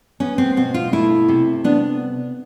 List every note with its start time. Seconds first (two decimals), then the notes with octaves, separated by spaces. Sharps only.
0.20 B3 C#4
0.38 C4
0.57 B2 C4
0.74 F4
0.92 A3 E4
1.29 C3
1.64 B3 D4